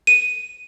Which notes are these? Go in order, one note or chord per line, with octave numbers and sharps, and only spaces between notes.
D#7